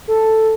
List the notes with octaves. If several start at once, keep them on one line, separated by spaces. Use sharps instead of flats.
A4